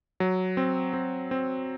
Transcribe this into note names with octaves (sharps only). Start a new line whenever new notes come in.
F#3
C4
C4
C4